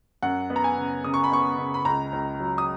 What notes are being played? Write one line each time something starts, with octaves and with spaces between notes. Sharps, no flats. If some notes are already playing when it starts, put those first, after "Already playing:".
F#2 F#5
B3
A#5
G#5
C#3
C#3 D#6
C#6
B5
B3 C#6
C#3
B5
C#2 A#5
C#2
F#3
D#6